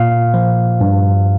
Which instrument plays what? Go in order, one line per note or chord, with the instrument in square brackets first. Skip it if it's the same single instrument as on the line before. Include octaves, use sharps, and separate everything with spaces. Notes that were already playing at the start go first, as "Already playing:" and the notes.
Already playing: [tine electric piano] A#2 F5
F3
G2